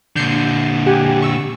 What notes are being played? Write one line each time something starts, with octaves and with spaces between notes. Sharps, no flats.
A#2 D3 G6 C7 C#7
G4 F#5 G#5
C#6 E6